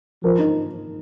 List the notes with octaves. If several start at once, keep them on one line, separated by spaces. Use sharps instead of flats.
F3 A#4
D#4